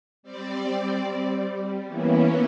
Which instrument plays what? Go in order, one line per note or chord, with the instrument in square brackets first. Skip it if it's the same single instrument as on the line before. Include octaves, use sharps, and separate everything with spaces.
[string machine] G3 C4 D5
G3
E3 A#3 B3 C#4 E4